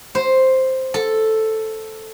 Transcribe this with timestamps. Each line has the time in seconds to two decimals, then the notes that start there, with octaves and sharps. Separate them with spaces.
0.15 C5
0.94 A4